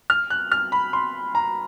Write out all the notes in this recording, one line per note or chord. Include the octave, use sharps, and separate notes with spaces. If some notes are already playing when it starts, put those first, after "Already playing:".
F6
F#6
F6
B5
C6
A#5